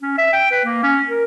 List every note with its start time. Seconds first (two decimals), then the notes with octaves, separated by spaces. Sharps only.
0.01 C#4
0.18 E5
0.33 G5
0.51 B4
0.65 A#3
0.83 C#4
1.09 A#4